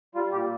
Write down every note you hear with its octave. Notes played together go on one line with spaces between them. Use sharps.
G3 F4
A#2 G4